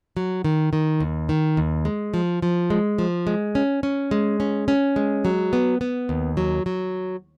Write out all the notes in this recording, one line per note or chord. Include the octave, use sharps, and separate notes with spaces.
F#3
D#3
D#3
D#2
D#3
D#2
G#3
F3
F3
G#3
F3
G#3
C#4
C#4
G#3
C#4
C#4
G#3
F#3
B3
B3
D#2
F#3
F#3